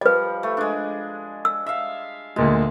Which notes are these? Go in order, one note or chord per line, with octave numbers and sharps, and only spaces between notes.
F3 G3 B4 D#5
A3
G#3 D4
E6
E5 F5
D2 A#2 G#3 A5